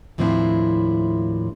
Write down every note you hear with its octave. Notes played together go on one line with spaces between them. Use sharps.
D#2 A2 F3 C4 D4 E4